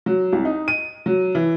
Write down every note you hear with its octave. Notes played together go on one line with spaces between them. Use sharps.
F#3
C2
D#4
D#7
F#3
E3